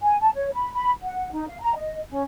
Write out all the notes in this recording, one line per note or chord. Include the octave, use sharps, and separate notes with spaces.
G#5
A5
C#5
B5
B5
F#5
D#4
F5
A#5
D#5
C#4